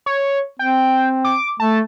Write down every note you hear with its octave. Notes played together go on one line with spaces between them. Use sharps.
C#5
C4 G5
D6
A3 A5